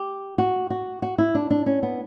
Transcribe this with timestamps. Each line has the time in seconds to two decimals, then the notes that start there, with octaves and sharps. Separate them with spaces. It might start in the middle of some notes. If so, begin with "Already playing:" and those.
Already playing: G4
0.38 F#4
0.70 F#4
1.02 F#4
1.18 E4
1.35 D4
1.50 D4
1.66 C#4
1.83 B3